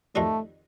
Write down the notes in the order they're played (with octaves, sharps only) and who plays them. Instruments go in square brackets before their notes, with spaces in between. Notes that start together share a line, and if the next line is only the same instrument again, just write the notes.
[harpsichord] F2 D#3 G3 D4 [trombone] A3